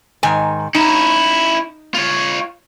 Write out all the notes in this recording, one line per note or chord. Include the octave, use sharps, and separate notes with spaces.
G#2 D#3 G#5
C#4 D#4 E4
F4 C#5